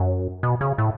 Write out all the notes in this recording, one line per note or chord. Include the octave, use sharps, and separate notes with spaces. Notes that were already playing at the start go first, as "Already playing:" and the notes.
Already playing: F#2
B2
C#3
A2